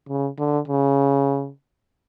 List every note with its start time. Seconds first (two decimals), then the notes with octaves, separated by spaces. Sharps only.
0.08 C#3
0.38 D3
0.68 C#3